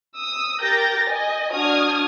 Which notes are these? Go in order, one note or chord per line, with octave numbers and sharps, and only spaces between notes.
D#6 E6
G4 A#4 G6 A6 A#6
D#5 G#5
D4 F#4 D#6 F6 G#6